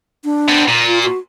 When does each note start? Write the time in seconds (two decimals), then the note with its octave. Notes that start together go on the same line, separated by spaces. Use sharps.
0.24 D4
0.48 B3 C4
0.68 A#2
0.87 F4
1.03 F#4